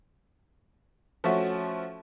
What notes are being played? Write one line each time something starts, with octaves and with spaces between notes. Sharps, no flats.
F3 A3 C#4 F#4 E5